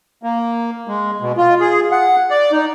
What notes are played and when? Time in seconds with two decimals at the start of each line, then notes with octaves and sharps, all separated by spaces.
0.23 A#3
0.88 G#3
1.21 B2
1.37 F4
1.60 G#4
1.92 F#5
2.30 D5
2.52 D#4